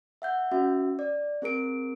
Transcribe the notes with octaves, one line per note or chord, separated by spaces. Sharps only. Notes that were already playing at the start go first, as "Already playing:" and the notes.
E5 F#5 G6
C#4 F#4 E5
D5
C4 G#4 A#4 D7